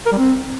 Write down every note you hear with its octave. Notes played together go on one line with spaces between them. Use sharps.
A#4
G3
C4